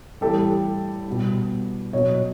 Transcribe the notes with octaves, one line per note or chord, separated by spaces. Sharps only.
A2 E3 G3 G4 A4
B2 G3
B2 F#3 C#5 D#5